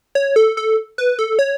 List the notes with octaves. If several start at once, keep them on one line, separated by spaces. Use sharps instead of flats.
C#5
A4
A4
B4
A4
C#5